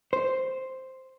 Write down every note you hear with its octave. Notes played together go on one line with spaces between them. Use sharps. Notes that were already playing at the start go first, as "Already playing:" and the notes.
C5